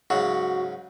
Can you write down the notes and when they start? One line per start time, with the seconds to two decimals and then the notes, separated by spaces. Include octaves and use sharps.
0.10 G#2 C#3 F#3 F#4